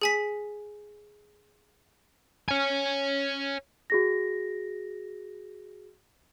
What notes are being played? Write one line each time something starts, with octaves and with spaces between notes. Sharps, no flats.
G#4 G#5 B6
C#5 G#5
F#4 G#4 A#6